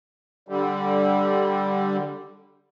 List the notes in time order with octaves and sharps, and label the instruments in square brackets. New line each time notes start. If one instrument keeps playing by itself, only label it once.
[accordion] D3 G3